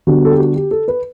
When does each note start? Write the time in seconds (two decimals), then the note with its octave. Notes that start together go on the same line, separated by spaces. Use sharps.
0.07 D3 G3 B3 D4 F#4
0.25 A4
0.32 G4
0.39 F#4
0.56 G4
0.71 A4
0.88 B4